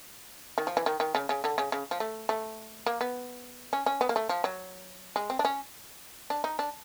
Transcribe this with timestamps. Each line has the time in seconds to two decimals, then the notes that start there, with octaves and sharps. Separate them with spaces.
0.58 D#3
0.67 F3
0.77 E3
0.86 D#3
1.00 D#3
1.15 C#3
1.29 C#3
1.44 D3
1.58 C#3
1.72 C#3
1.91 F3
2.00 A3
2.29 A3
2.86 A#3
3.01 B3
3.73 C#4
3.86 C#4
4.01 B3
4.09 A#3
4.16 A3
4.29 F3
4.44 F#3
5.16 G#3
5.30 C4
5.39 D4
5.45 C#4
6.30 D4
6.44 D#4
6.59 D4